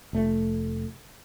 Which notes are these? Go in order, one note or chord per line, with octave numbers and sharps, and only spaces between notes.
F1 A3